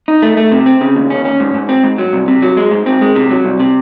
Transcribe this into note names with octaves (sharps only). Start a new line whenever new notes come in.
D#4
A3
A3
C3
C4
C#3
D#2
C#4
C#4
G#2
G#2
C4
G#2
F#3
C2
C3
F#3
G#3
G#2
C4
G#3
C3
F#3
C2
C3